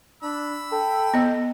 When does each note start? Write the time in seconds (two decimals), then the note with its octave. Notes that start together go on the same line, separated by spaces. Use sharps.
0.23 D4 B5 E6
0.72 A4 G5
1.14 B3 D#5